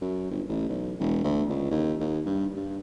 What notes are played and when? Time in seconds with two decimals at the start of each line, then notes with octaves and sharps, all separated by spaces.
0.01 F#2
0.31 G1
0.49 A1
0.69 B1
0.99 E1
1.24 D2
1.50 C#2
1.71 D#2
2.00 D#2
2.26 G2
2.56 G2